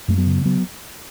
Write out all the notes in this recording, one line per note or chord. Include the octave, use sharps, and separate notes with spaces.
F#2 A3
F#3 B3
C#3
F#3 B3